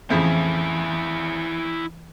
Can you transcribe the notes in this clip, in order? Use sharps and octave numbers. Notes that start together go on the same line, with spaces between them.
F2 A2 C#3 E3 E4 G#4